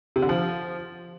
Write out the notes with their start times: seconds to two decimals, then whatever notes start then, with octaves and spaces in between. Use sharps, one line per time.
0.16 C3
0.22 D3
0.29 F3